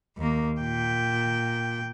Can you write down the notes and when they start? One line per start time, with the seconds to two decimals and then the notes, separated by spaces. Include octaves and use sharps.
0.17 D#2 A#3
0.62 A#2 G5